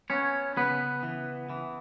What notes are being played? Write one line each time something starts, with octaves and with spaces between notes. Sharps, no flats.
B3 C#4 C#5
C#3 B3 B4
E3
E3